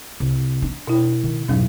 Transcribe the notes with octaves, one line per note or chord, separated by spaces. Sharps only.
C2
D4
B2 E4
D#3
F2 G#2 B2 F#3 C#4